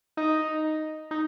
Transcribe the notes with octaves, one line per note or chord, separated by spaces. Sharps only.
D#4
D#4